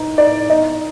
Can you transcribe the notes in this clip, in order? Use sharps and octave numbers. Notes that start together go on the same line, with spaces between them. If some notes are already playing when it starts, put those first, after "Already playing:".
Already playing: D#4 D#5
D#4 D5
D#4 D#5